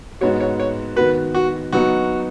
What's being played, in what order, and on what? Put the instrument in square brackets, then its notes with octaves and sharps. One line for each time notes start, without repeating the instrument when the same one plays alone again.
[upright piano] G#2 G#3 B3 F#4 [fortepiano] C#5
[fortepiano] C#5
C#5
[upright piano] D#3 B3 F#4 [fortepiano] B4
[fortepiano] F#4
[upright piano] F#3 B3 D#4 [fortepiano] F#4